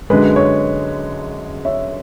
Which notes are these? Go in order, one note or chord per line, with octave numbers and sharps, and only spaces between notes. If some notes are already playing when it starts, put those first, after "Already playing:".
F#2 D3 G#3 B4
C#5
C#5 E5